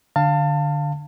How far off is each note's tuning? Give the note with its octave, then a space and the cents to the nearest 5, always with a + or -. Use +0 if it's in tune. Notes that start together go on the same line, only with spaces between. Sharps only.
D3 +10 F5 +0 A5 +25